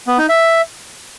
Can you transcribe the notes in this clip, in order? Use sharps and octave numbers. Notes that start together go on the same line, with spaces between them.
B3
D#4
E5